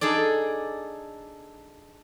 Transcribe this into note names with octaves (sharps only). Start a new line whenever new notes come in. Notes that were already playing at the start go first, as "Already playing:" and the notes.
D4 D#4 G#4 A4 D5